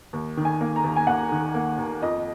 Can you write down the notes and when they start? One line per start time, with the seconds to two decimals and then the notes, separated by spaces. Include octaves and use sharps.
0.13 D#2
0.37 D#3
0.45 G#5
0.61 A#3
0.76 A#5
0.84 D#2
0.96 G#5
1.07 D#2 F#5
1.32 D#3
1.55 A#3
1.78 D#2
2.02 F2 D#5